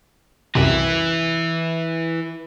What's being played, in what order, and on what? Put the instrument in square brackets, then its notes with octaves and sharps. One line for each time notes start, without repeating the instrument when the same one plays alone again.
[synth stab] C2 F#2 C3 [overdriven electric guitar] E3 E4